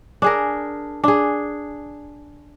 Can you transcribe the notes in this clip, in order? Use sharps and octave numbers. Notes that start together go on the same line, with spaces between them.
D4 G#4 A#4
D4 G#4